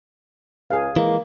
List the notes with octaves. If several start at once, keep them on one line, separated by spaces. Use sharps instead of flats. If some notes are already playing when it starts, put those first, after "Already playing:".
C#2 G#4 F5
E3 G#3 A#3